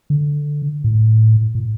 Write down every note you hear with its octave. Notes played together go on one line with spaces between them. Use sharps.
D3
A2
A2